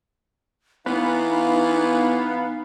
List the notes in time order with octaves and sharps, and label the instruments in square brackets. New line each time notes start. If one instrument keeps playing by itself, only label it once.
[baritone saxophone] E3 [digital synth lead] B3 [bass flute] D#4 [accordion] F5